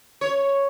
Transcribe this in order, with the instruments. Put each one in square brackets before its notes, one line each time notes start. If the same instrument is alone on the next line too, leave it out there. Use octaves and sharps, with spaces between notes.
[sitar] C#5